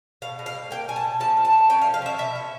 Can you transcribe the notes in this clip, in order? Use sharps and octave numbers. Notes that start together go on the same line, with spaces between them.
B2 F5
B2
F5
G3
A#3 G5
B2 G#5
A5
B2
F3 A5
F3
A5
A3
C#4 G5
F5
F3
F5
F3 E5
B2 E5
C#4